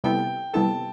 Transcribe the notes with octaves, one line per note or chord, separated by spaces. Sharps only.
C3 G3 B3 E4 A4 G5
C3 G3 B3 E4 A4 A5